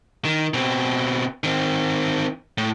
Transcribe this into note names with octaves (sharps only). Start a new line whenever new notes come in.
D#3
B2 C4
D#3 C4
A2